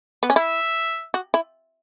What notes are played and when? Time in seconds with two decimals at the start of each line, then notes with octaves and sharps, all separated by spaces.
0.23 B3
0.30 C#4
0.36 E4 E5
1.14 F#4
1.34 E4